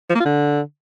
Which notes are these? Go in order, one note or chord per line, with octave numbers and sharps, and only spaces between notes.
F3
A#3
F4
D3